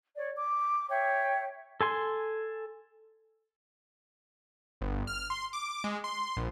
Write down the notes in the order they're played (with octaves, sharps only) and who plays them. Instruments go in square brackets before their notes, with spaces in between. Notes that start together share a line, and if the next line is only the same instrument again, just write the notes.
[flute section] C#5 D5
D6
C#5 E5 G5
[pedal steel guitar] A4 G#5 C6
[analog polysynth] G1
F6
C6
D6
G#3
C6
A#1